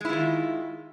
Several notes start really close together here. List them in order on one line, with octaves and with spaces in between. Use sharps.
G#3 E4 F4 D#3